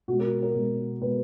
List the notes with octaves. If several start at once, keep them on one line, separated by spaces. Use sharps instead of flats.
B2 G#3 F#4
A#4
A#4
B2 G#3
B2 G#3 B4